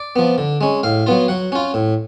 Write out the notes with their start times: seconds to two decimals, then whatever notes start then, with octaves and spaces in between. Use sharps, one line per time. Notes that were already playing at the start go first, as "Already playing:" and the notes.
Already playing: D5
0.16 F3 B3
0.38 D3
0.61 G#3 C#4
0.83 A2 F5
1.06 F#3 B3 F4
1.28 F#3 F#5
1.52 C#4 F4
1.74 A2